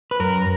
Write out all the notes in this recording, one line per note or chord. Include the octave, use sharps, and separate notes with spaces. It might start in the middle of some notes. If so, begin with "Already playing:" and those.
B4
F#2 A#4